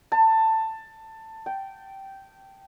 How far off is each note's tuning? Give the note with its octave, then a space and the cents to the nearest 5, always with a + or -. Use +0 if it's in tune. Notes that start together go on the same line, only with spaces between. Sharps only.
A5 +15
G5 -10